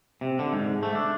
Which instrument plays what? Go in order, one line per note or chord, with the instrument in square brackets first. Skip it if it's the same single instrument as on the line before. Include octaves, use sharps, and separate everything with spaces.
[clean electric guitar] C3
D3
G#2
A3
D4